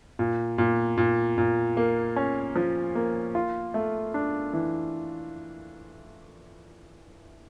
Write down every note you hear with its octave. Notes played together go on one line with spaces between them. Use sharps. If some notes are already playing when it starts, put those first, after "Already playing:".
A#2
A#2
A#2
A#2
A#3
C#4
F3
A#3
F4
A3
D4
E3